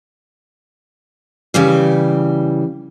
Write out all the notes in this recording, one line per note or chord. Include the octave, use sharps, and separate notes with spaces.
C#3 E3 G3